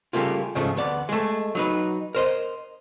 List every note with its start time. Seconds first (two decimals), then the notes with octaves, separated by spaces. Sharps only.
0.13 C#3 G3 A3 A#3 F4
0.55 C#2 G#2 C#3 F3 A3
0.76 D2 B3 D5
1.09 G#3 A3
1.55 F#3 D#4 B4
2.15 A#4 C5 D#5